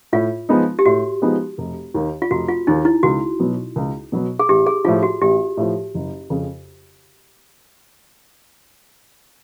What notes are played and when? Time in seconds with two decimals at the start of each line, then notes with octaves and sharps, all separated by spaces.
0.13 A2 F4
0.49 F3 G#3 B3 D#4
0.79 G4
0.85 A2 F#4
1.22 F3 G#3 B3 D#4
1.58 F1
1.94 D#2 D#3
2.22 F4
2.31 F1 F#4
2.49 F4
2.67 D#2 D#3 D#4
2.85 E4
3.03 C#2 F#4
3.40 B2 F#3 B3
3.76 C#2
4.12 B2 F#3 B3
4.39 G#4
4.49 A1 G4
4.66 G#4
4.85 A2 F3 F4
5.03 F#4
5.22 A1 G4
5.57 A2 F3
5.94 F#1
6.30 F2 C#3